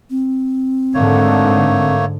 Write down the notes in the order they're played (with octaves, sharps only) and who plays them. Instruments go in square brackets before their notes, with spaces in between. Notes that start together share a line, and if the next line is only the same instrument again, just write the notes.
[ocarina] C4
[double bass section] G#2 D3 [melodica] A3 A#3 C#5